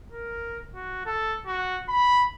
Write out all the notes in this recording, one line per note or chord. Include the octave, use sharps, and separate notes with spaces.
A#4
F#4
A4
F#4
B5